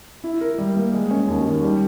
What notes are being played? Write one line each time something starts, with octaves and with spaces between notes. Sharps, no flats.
E4
A#4
G3
A#3
G#3
C#4
D#2
D#3
G3